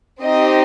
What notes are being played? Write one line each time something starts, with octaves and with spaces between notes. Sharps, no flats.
C4 D#4 G4 D#5